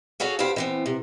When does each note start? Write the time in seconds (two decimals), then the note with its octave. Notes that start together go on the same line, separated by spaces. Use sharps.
0.20 F#4 G#4 A4 C#5 F5
0.39 D2 D3 G4 B4 C5 F5
0.56 E3 B3 C4
0.86 C3